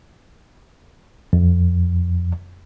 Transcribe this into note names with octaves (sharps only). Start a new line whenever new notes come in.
F2